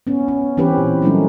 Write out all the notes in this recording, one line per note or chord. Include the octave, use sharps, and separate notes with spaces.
B3 C#4
C#4
E3 C4 C#4 G4 B4
A#2
F#3 G3 A3 A#3 C#4 D#4